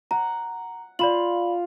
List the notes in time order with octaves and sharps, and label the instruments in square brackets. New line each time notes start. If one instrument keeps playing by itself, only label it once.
[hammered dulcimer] F#5 [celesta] A#5
[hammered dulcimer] F4 [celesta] D5 B5 F#7